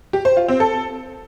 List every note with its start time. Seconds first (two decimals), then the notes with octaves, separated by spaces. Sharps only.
0.13 G4
0.25 C5
0.37 F4
0.48 C4
0.60 A4